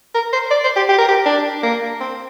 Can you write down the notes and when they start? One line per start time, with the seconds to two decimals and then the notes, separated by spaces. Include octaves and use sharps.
0.15 A#4
0.33 C5
0.51 D5
0.64 C5
0.76 G4
0.89 G4
0.98 A#4
1.09 G4
1.26 D4
1.63 A#3
2.00 C4